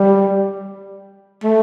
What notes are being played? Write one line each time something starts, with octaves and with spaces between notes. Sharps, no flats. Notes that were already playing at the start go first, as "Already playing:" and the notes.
Already playing: G3
A3